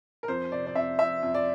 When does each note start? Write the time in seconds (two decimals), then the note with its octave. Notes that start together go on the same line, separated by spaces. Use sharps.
0.23 A#4
0.28 F2 C5
0.52 C3 D5
0.66 D5
0.75 F2 E5
0.99 F2 E5
1.23 F2
1.34 D5